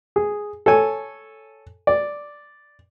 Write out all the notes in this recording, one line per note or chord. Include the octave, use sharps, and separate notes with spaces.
G#4
A4 C#5 G#5
D5